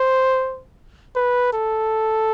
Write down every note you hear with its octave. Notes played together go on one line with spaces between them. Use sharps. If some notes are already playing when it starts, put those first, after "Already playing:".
Already playing: C5
B4
A4